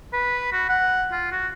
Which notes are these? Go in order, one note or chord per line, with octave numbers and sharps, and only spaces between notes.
B4
F#4
F#5
F4
F#4